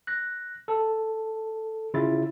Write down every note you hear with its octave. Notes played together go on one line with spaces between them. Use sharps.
F#6 A#6
A4
C#3 E4 F4 E5 A6